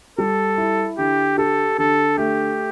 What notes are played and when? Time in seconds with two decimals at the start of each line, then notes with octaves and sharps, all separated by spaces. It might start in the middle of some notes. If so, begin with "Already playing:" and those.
0.18 G3 A4
0.58 E4
0.98 D3 G4
1.38 G4 A4
1.78 D3 A4
2.18 A3 G4